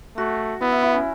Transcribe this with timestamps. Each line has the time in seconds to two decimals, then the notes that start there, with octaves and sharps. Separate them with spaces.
0.17 A3 F#4
0.61 B3 E4
0.72 E4
0.82 E4
0.94 C#4